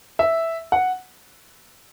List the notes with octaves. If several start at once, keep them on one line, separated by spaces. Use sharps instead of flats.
E5
F#5